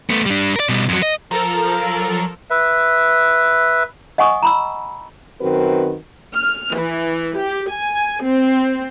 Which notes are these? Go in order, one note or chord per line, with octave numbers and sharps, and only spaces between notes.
A3 B3
G3 D4
A#4 D5
B2 G3
F2 F#3
D#5
F3 F#3 A4 A#4 A#5
B4 E5
D#5 F#5 G#5 C#6 D#6
A#5 B5 E6
F#2 D#3 C4 F#4 A#4 B4
F6
E3
G4
G#5
C4